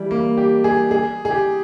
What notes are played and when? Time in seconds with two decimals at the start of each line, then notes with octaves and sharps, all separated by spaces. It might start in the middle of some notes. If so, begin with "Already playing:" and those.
Already playing: E3 G3
0.11 A#3
0.38 G4
0.64 G#4
0.91 G#4
1.25 G#4
1.31 G4